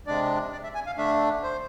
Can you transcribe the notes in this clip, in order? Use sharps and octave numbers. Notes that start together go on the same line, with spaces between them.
C3 G#3 D4 D5
D5
E5
G#5
F5
D3 A3 D4 E5
C5